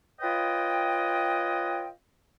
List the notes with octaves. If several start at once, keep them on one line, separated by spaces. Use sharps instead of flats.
F4 B4 C#5 D#5 G5